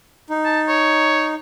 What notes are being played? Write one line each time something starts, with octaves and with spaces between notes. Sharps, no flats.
D#4
A5
C#5